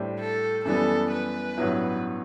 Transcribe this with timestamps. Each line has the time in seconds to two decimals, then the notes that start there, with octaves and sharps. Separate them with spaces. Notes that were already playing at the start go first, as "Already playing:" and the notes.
Already playing: A2 G3 D4 G4 C5
0.20 A4
0.65 F#2 E3 G3 B3 A4
1.11 B4
1.57 A1 G2 F#3 B3 E4